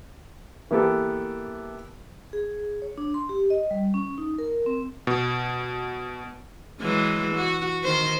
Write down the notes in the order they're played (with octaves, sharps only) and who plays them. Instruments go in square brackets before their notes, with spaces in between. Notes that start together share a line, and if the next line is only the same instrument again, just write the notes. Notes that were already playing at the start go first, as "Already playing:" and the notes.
[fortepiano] E3 A#3 B3 G4 A4
[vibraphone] G#4
C#5
D4
C6
G4
D#5
G3
C#4
D#4
A#4
C4
[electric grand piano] B2
[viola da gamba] E3 F#3 G#3
F#4
D#3 C5